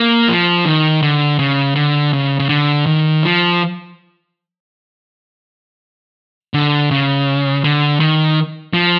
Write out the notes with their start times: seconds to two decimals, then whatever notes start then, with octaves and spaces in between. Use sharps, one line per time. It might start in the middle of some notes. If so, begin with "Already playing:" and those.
Already playing: A#3
0.29 F3
0.66 D#3
1.03 D3
1.39 C#3
1.76 D3
2.13 C#3
2.39 C#3
2.49 D3
2.86 D#3
3.23 F3
6.54 D3
6.91 C#3
7.64 D3
8.00 D#3
8.74 F3